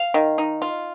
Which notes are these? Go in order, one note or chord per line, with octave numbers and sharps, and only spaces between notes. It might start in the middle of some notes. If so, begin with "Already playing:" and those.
Already playing: F5
D#3
D#4
F4